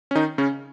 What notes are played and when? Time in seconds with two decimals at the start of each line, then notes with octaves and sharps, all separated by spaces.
0.11 C#4
0.15 D#3 D#4
0.38 C#3 C#4